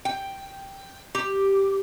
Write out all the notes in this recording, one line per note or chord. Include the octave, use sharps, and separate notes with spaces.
G5
G4